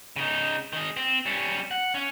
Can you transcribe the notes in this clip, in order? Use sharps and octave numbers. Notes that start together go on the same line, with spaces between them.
C#3 D#4
D#3 G#4
C4
G3 C#4
F#5
C#4